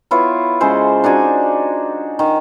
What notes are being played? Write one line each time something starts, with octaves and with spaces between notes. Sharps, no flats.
B3 E4 F4 C#5
C#3 G#3 A4 C5
D4 D#4 F#4 G#5
D#3